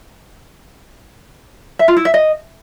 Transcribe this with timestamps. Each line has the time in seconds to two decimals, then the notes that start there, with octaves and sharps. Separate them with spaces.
1.79 E5
1.88 F4
1.97 E4
2.05 E5
2.14 D#5